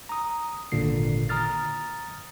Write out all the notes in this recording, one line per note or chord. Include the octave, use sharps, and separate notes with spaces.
A#5 D#6
G#1 A#2 D3 C7
A#5 D#6 F6 A6